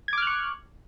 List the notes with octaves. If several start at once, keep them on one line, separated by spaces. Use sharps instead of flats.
C#6 D6 F6 F#6 G#6